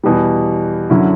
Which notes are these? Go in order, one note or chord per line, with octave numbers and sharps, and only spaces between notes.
E2 B2 G3
F#2 D3 F#3 C#4 E4